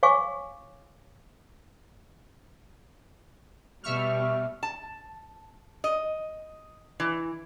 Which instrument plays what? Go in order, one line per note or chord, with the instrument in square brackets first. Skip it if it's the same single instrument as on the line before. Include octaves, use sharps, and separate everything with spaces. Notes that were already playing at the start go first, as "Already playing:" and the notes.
[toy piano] C#5 F5 G#5 C#6 D6
[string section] B2 G3 [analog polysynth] E5 C#6 F6
[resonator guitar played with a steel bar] A5
D#5
E3